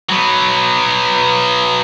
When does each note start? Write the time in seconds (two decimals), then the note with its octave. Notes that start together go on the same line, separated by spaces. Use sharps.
0.10 F#3 B3